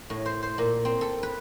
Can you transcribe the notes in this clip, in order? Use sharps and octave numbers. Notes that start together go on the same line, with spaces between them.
A2
C5
C5
A#2
C4
A4
B4